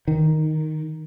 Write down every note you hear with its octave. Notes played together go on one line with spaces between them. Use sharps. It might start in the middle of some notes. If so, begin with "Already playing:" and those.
D#3